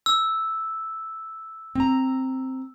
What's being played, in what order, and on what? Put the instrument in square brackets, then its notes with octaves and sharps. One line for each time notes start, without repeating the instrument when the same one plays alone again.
[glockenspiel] E6
[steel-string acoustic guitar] C4 A#5